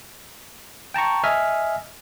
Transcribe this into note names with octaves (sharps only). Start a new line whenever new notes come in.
G5 A5 A#5 C#6
D#5 E5 G#5 F6